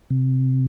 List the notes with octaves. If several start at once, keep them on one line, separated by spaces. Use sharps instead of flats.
C3